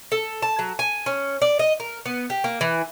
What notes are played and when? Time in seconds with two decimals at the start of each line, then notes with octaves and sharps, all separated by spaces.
0.12 A4
0.42 A5
0.59 F#3
0.79 G#5
1.06 C#4
1.42 D5
1.59 D#5
1.80 A#4
2.06 B3
2.30 G4
2.44 A#3
2.61 E3